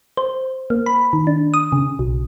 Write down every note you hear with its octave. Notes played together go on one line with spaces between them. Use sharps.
C5
A#3
B5
D#3
D4
D#6
C#3
B1